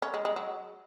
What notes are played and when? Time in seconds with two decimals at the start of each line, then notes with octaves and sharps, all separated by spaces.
0.02 C#4
0.14 G#3
0.25 G#3
0.36 F#3